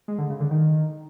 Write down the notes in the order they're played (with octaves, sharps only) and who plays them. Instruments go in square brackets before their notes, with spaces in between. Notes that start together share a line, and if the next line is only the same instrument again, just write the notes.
[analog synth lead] G#3
D3
C#3
D3
D#3